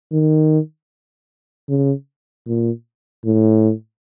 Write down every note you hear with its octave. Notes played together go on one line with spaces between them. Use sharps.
D#3
C#3
A#2
A2